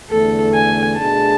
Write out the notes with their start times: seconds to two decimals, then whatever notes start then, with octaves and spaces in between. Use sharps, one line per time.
0.11 E2 D3 A3 A4
0.55 G#5
0.99 B2 A3 D4 G#4 A5